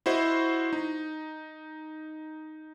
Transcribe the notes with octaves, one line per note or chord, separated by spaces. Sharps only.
E4 F#4 C5 D#5
D#4